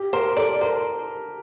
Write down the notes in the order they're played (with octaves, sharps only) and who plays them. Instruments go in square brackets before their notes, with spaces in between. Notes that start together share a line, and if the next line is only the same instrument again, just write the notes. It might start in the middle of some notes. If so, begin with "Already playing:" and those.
Already playing: [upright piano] G4
[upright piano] A#4 [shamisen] C5
[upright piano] A4 [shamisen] D5
[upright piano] A#4 [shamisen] C5